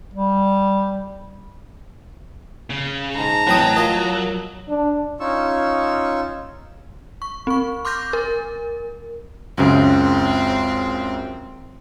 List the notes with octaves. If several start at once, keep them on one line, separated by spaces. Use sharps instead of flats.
G3
C#3
G#2 A5 A#5
A1 F#3 C4 G5 D#6
F4 A#4 D#5
D4
C#4 D#4 F4 C#6 E6
C#6
C4 C#6
C6 D6 F6 G6 A#6
A#4
C#2 F#2 C#3 C4